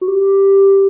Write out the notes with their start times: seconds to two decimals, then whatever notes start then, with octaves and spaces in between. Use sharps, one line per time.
0.01 F#4
0.08 G4